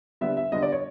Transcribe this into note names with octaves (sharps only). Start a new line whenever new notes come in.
D3 G3 B3 E5
E5
D3 G3 B3 D#5
D5
C#5